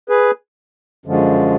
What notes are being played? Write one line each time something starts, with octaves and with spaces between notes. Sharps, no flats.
G#4 B4
F#2 D3 F3 G#3